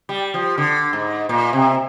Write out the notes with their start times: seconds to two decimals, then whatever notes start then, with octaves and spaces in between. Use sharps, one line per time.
0.09 G3
0.34 F3
0.58 D3
0.93 G#2
1.29 A#2
1.53 C3